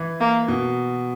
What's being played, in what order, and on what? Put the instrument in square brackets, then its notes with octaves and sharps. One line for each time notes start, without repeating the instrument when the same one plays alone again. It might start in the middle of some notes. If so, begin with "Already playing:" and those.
Already playing: [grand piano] E3
[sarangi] A#3
[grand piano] B2